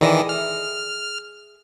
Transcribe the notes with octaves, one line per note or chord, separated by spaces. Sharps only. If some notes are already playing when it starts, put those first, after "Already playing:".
D#3 E3 G#4 D5 E5 A#6
F6